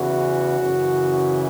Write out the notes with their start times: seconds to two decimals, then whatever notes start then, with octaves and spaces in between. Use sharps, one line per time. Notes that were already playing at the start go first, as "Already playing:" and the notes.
Already playing: E2 C#3 E3 F#4
0.58 F#2 C#3 E3